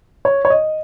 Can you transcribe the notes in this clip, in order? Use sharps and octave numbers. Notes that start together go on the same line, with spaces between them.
C#5
C#5
D#5